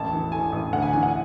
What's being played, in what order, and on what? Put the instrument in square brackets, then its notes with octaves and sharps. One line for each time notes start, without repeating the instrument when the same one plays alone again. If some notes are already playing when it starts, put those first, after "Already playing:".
Already playing: [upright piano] E1 A1 A5
E3
A2 G#5
A1
D2 F#5
G#5
E3 G#5
F#5